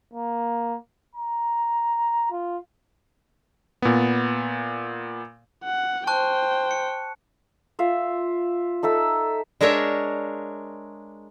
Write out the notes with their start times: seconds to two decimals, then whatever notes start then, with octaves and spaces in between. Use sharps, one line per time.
0.13 A#3
1.15 A#5
2.31 F4
3.82 A#2 B3
5.64 F#5
6.07 C5 G5 A5 C#6 F#6
6.71 C#7
7.79 F4 E5 F5
8.83 D#4 A4 E5 E6
9.61 G#3 D4 A#4 C#5 E5